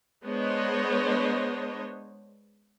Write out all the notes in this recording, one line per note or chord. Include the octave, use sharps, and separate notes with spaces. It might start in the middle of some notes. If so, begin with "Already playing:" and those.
G#3 B3 D4 C5 C#5 D#5